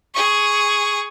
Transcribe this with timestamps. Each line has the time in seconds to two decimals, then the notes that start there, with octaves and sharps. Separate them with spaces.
0.14 G#4 C#6